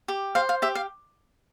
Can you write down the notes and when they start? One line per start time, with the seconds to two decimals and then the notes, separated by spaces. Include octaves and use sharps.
0.08 G4
0.35 C5 F5
0.49 F5
0.62 G4 E5
0.75 F5